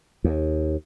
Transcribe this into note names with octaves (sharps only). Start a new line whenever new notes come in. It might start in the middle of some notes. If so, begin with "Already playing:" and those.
D#2